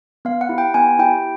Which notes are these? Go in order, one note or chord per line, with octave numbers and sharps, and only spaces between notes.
B3 F5
F#5
E4 G4
G5
B3 G#5
E4 G4 G5